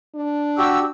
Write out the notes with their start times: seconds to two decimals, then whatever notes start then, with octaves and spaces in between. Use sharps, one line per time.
0.15 D4
0.58 F#4 G4 E6